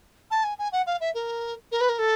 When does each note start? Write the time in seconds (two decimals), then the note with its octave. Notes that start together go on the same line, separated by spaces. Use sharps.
0.30 A5
0.44 G#5
0.58 G#5
0.72 F#5
0.86 F5
1.00 E5
1.14 A#4
1.71 A#4
1.80 B4
1.89 A#4
1.98 A4